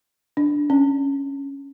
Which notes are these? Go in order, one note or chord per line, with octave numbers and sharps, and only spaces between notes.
D4
C#4